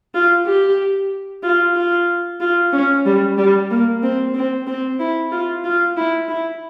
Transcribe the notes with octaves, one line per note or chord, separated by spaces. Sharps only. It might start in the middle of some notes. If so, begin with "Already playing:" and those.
F4
G4
F4
F4
F4
C#4
G3
G3
A#3
C4
C4
C4
E4
F4
F4
E4
E4